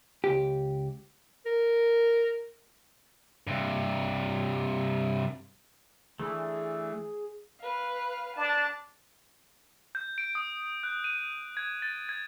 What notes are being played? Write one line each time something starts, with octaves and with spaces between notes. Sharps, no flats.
C#2 G4
A#4
G2 C3
E3 A3 D4 G#4
B4 F5
D4 A5
G6
D7
D#6
F#6
D#7
G#6
A6
G#6